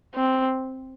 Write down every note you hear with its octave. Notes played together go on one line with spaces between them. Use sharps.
C4